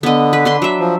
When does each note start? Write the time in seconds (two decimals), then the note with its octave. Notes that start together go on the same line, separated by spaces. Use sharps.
0.03 D3 B3 D#5
0.33 B4
0.45 D4 B4 C6
0.62 F#3 E5
0.80 F3